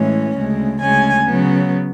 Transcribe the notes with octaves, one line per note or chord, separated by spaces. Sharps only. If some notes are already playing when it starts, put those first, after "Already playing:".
Already playing: A2 E3 G#3 C#4
D2 C#3 G#3
D2 C#3 G#3 C#4 G#5
C#3 F#3 B3